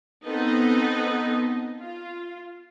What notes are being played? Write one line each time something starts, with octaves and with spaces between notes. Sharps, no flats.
B3 C4 D#4 A4 D#5
F4